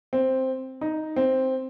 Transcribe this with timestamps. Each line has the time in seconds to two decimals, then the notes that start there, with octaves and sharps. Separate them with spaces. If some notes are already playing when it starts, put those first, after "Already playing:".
0.13 C4
0.81 D#4
1.16 C4